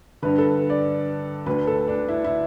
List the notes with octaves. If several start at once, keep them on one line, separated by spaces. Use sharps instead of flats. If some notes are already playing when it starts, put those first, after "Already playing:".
G2 D3 B4
A4
D5
D2 D3 B4
A4
D4
E4
E4